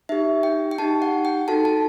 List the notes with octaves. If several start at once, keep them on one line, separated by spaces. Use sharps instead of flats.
D#4 G4 E5
G5
G5
D#4 G4 A5
F#5
G5
D#4 F#4 A4 A5
A5